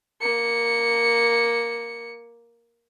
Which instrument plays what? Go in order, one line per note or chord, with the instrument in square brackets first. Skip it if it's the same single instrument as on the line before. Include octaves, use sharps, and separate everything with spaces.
[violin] A#3 C#7